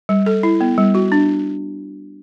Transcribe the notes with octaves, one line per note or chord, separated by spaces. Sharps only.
G3
A4
E4
B3
G3
F#4
D4